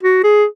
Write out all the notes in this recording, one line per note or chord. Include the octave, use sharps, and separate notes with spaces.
F#4
G#4